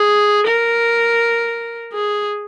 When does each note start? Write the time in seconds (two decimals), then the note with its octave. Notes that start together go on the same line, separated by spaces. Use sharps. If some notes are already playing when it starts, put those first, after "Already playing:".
Already playing: G#4
0.47 A#4
1.93 G#4